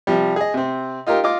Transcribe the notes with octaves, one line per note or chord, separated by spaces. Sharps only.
C3 F3 G3
G#4 D#5
C3 C4
D#4 F4 G4 A#4
F4 D#5 D6